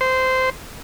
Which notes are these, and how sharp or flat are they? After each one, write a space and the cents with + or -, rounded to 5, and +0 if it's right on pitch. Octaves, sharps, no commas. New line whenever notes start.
C5 -15